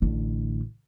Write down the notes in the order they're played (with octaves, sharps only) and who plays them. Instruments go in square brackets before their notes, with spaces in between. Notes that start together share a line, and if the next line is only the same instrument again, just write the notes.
[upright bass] A1 D3